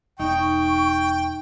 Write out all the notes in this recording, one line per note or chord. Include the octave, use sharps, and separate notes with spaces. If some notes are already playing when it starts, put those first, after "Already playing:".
E1 D#4 G5 C#6